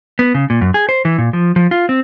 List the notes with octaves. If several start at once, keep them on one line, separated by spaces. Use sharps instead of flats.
B3
C#3
A#2
F#2
G#4
C5
E3
A#2
F3
F3
F4
C4